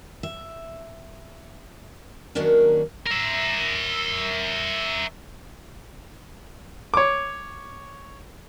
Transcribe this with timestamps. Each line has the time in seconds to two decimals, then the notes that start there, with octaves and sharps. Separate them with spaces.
0.23 E5
2.35 D#3 F#3 A#3 C#4 D4 A#4
3.06 A#4 E5
6.94 C#5 D6